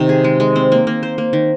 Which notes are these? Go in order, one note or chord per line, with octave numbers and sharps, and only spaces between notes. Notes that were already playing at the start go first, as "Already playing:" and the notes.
Already playing: C3 D#3
G#4
G#3
G#3
C4
A#3
A#3
C5
A#3
D#3